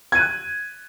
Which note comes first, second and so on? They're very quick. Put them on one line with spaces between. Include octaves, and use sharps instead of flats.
G#6 D#7 F#6